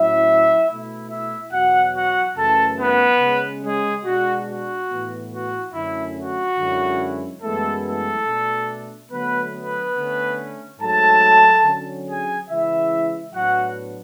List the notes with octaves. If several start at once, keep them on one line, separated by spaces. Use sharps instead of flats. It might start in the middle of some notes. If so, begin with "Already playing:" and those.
Already playing: A2 F#3 C#4 E4 E5
B2 A3 E4
E4 E5
E2 B2 F#3 F#4 F#5
F#4 F#5
F#2 C#3 E3 A3 A4 A5
B3 B4
C#3 G#3 C#4
G#3 G#4
B2 G#3 D4 F#4
F#4
A2 E3 B3
F#4
F#2 D3 A3 C#4 E4
F#4
F#2 D3 G#3 C#4 E4
F#2 E3 G#3 A3 B3 E4 A4
A3 A4
B2 A3 D4
D3 F#3 A3 B3 B4
B3 B4
D3 A3 C#4
G#2 F#3 A3 A4 A5
D3 F#3 C#4
G#4 G#5
C#3 E3 G#3 E4 E5
A2 F#3 B3 D4 F#4 F#5